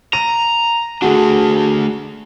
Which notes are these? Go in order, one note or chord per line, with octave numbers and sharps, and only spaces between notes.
A#5 D#7
A3 D4 F#4 G#4